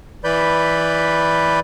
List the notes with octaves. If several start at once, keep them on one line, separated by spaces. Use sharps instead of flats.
E3 B4 D5 B5 G6